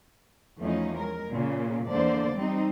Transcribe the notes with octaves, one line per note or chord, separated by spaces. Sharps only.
E2 F3 A3 C#4 D#4
G#3 A#4
A#2 C#3
E2 D3 A#3 C5 D5
G3 C4 D#4